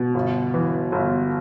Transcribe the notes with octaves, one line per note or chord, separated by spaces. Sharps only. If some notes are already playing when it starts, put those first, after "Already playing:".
Already playing: B2
G1
E3
G1